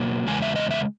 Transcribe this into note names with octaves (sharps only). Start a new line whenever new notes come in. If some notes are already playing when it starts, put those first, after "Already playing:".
Already playing: B2 F#3 A#3
E2 C#3 G#3 G#5
E5
D#5
E5